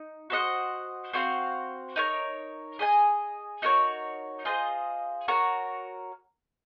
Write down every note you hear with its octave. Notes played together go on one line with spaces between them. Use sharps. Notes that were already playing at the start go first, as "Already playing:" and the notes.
Already playing: D#4
F#4 C5 D#5 F#5
C4 F#4 C5 F5
D#4 A#4 C#5
G#4 D#5 G#5
D#4 F#4 A#4 C#5
F4 G#4 C5 D#5
F#4 A#4 C#5